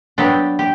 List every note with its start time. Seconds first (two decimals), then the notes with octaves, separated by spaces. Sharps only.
0.18 F#3 B3 D4 G4
0.59 G4